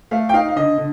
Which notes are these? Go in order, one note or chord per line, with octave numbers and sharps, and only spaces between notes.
A3 F5
G5
D#4 F5
F5
D3 D#5
D3